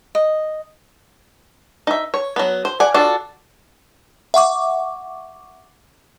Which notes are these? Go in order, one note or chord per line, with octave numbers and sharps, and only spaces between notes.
D#5
D#4 E5
C#5
F#3 B3
C5
D5 F#5 G#5
D4 F4 F#4 A4
E5 F#5 C#6 D6